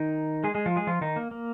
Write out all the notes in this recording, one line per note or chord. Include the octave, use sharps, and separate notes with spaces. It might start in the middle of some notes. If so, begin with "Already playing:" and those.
Already playing: D#3 D#4
G#3 G#4
G#3 G#4
F3 F4
G#3 G#4
F3 F4
D#3 D#4
A#3
A#3